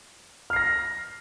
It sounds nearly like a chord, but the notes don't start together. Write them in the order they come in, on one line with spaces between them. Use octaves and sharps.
F6 C7 A#6